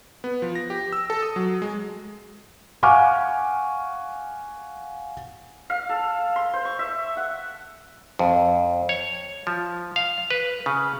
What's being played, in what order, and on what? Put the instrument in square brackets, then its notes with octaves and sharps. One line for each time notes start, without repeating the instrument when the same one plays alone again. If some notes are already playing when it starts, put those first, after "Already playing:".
[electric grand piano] B3
F3
A#6
G4
E6
A4
D#6
F#3
G#3
[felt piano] F5 F#5 G#5 C#6 D6 F6
[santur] F5
A4
C6
C5
C#6
E5
F#5
[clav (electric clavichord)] F2
C#5
F3
F5
B4
C#3